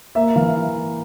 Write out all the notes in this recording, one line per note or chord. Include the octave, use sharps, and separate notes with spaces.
A#3 E5
E3 F5